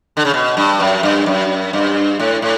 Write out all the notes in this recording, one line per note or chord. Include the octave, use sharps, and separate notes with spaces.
D3
C#3
B2
G2
F#2
G2
F#2
G2
A2
A2